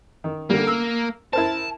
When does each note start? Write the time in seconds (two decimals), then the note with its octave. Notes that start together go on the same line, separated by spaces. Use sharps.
0.24 D#3
0.50 D3 G3 A#3
0.67 E6
1.33 E4 A#4 C5 A5